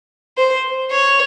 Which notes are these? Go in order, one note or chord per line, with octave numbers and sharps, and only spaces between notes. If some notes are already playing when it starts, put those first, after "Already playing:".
C5
C#5